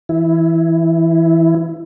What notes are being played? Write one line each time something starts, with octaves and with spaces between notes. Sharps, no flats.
E3 E4